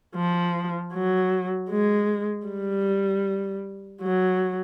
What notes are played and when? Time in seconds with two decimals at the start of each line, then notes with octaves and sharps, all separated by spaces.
0.15 F3
0.93 F#3
1.70 G#3
2.47 G3
4.02 F#3